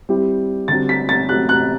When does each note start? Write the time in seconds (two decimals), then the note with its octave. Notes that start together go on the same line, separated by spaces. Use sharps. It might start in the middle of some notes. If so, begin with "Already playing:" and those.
0.09 G3 C4 E4 G4
0.68 D3 G3 C4 F#4 A6
0.89 B6
1.09 A6
1.28 F#3 A3 C4 G4 F#6
1.49 F#6